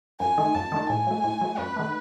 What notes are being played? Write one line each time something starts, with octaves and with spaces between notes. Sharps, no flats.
F#2 G#5
D#3 A3 D#4
F#2 A5
D#3 A3 D#4
A2 G#5
F#3 A3
A2
F#3 A3
F#2 B4
D#3 A3